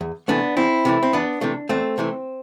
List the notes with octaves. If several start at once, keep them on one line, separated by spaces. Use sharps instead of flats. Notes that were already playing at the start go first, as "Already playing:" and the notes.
E2
C3 E3 A3 B3 D4
E2 C4 E4
C3 E3 A3
C4
E2 B3 D4
C3 E3 A3
E2 A3 C4
C3 E3 A3